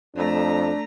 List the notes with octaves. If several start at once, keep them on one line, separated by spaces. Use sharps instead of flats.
F2 A3 D4 A#5